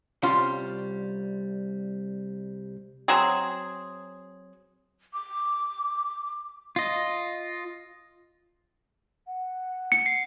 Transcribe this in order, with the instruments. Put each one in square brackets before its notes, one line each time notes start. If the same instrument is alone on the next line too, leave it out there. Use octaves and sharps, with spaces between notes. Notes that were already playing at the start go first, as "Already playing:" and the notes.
[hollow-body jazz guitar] C2 G3 C#4 F4 C6
[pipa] F#3 C4 G#4
[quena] D6
[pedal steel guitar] F4 D#5
[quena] F#5
[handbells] C#7
[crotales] C7